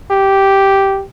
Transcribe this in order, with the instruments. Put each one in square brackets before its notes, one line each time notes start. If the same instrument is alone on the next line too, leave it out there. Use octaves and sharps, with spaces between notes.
[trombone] G4